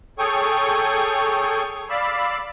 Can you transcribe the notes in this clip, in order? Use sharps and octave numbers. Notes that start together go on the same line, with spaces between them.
G#4 A4 C#5 G5 C#6 D#6
D5 F5 B5 E6